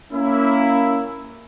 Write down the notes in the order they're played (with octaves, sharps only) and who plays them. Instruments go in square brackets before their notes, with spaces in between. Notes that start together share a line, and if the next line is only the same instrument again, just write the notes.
[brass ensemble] A#3 C#4 E4